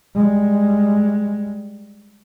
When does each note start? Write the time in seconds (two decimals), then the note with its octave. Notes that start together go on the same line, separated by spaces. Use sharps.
0.15 G3 G#3